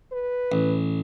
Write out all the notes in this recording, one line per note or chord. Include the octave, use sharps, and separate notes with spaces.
B4
A1